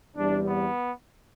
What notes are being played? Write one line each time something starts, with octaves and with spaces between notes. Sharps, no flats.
E2 C3 G3 D4
B3